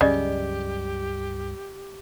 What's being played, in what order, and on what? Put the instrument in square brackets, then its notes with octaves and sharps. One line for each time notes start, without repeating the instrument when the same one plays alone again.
[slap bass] C#2 G2 F#3 [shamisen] C#3 [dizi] G4 [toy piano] D5 D#5